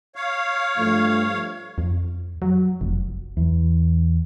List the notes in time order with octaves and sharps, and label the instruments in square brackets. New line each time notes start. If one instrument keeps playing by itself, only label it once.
[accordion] C#5 F5
[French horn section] G2 F3 A3
[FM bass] F2
F#3
F1
[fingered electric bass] E2